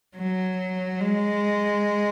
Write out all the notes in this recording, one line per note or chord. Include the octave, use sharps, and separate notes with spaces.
F#3
G#3